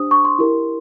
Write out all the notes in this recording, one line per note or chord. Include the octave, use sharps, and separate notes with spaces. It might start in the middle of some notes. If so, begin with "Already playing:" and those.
Already playing: D4 G4 C5 D#6
C#6
C6
E4 G4 A#4